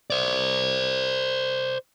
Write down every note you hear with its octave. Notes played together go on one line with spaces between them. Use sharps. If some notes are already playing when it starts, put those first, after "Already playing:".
C5 D5